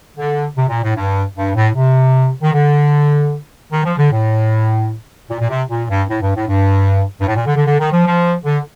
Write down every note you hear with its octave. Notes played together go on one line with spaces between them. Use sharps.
D3
C3
A#2
A2
G2
G2
A2
C3
D#3
D3
D#3
F3
D3
A2
A#2
A#2
C3
A#2
G2
A2
G2
A2
G2
G2
A2
A#2
D3
D3
D3
D#3
F3
F3
D3